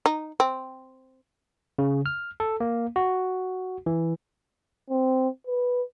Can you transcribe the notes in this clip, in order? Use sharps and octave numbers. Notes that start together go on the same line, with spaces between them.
D#4
C4
C#3
F6
A4
A#3
F#4
E3
C4
B4